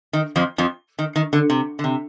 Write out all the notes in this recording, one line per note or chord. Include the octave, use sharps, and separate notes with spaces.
D#3
F2 F3
F2 F3
D#3
D#3
D3
C3
D3
C3